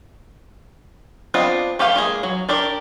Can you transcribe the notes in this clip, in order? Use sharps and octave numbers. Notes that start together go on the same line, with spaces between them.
B3 C4 D4 F4 D#5
A3 G4 B4 F5 G5
G#3 A#3 G#4
F#3
D4 G4 A#4 D5